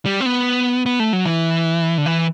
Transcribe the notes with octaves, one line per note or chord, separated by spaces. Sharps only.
G3
C4
B3
B3
A3
F#3
E3
D3
E3